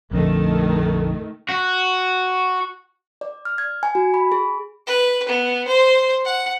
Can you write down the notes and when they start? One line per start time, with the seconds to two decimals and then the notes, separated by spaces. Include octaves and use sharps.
0.11 A#1 F2 D3 D#3 A3
1.49 F#4
3.21 D5
3.45 F6
3.58 G#6
3.83 G#5
3.95 F#4
4.14 B5
4.32 G#4
4.87 B4
5.29 B3
5.67 C5
6.25 F#5